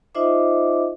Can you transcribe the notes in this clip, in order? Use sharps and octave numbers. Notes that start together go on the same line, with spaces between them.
D#4 F4 C5 D#5 E5 D6